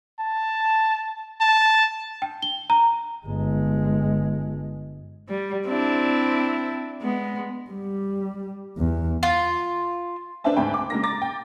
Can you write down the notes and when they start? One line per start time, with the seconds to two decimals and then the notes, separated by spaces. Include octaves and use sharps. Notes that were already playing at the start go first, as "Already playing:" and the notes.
0.20 A5
1.41 A5
2.22 G5
2.42 G7
2.70 A#5
3.27 G1 G#3
5.29 G3
5.66 C4 D4 E4
7.02 G#3 B3
7.71 G3
8.78 E2
9.23 F4
10.44 D4 B4 C5 E5 A5
10.56 D2 G#2 C4 G5 B5
10.74 D6
10.90 C#3 G#3 A#3 A#6
11.03 A#5 D6 A6 A#6
11.22 G5